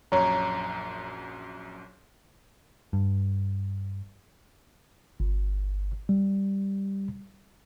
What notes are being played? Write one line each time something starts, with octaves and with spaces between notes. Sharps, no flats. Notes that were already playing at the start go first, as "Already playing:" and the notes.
A#1 F#2 C#5 A#5
G2
G1
G3